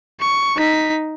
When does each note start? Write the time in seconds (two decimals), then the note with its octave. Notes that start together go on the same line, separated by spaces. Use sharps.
0.20 C#6
0.57 D#4 B6